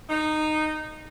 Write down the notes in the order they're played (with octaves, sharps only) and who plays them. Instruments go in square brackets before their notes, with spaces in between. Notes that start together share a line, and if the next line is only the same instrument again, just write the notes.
[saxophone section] D#4